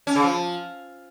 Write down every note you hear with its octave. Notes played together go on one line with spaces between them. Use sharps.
C#4
C#3
F3